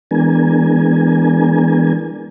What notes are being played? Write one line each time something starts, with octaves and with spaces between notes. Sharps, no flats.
E3 G#3 B3 D4 A#4 G#5